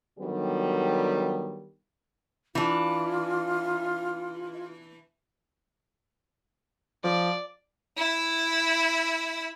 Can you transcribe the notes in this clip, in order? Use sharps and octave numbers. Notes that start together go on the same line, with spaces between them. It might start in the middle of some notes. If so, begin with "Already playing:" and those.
D3 D#3 F#3 G3 B3
E3 D4 F4
F3 D5
E4 E5